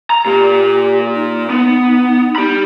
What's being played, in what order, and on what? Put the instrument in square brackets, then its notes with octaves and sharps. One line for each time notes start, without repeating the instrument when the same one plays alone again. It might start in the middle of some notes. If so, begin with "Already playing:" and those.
[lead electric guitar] A#5
[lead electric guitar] A#2 A#3 [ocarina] G4
[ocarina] D#4
[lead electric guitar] B3
G4 B5